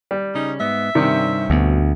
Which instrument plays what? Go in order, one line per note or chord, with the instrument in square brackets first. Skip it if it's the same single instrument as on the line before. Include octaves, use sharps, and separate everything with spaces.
[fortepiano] G3
[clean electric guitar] C#3 C#4 [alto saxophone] D#4
[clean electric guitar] G#2 B3 [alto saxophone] E5
[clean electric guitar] G2 C4 C#4 [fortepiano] C3 D#3 G3
[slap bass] D2 [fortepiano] B2